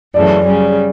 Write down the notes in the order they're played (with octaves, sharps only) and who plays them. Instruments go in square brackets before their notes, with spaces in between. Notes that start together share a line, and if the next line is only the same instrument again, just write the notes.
[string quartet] F#2 C#3 E3 A3 [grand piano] D5
[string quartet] C#3 G3 C#4